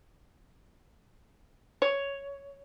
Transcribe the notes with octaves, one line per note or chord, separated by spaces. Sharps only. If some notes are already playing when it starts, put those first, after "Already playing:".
C#5